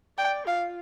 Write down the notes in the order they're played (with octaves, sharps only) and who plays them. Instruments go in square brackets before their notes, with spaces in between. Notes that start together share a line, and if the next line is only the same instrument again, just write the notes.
[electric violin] D5 [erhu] G5
[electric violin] F4 [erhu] F5